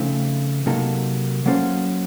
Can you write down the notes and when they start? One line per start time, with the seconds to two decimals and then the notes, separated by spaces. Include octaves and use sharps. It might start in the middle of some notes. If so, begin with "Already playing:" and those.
Already playing: C#3 F3 A3 C4 D#4
0.66 C3 F#3 A#3 D#4 A4
1.46 F#3 A#3 C#4 A4 C5